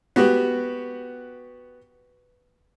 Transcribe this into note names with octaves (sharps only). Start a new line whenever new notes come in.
B3 F#4 G4